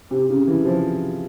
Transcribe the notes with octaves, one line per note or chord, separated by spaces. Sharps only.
C3
C#3
E3
F3